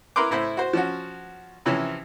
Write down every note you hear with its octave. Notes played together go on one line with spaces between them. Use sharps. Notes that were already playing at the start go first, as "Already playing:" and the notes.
E4 A#4 B4 C6 D6
A2 E4 C5
F#4 C5
F3 C#4 F#4
C3 E3 F3 C#4